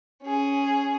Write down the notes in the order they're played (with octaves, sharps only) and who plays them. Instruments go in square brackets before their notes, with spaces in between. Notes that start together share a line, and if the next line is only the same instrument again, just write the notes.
[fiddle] C#4 G#4